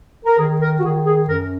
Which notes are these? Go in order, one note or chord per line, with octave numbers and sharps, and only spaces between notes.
A#4
D#3 G#4
A#4
F#4
D#3 G#4
G#4
F#2 A#4